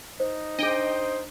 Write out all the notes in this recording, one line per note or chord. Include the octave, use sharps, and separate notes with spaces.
D#4 C5
D4 G#4 C5 D#5 G5